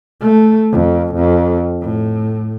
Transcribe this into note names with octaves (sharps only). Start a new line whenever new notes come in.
A3
F2
F2
A2